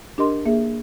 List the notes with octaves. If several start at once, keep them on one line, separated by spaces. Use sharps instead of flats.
D4 G4 A#4 D#5 C6
A#3 G#4 E5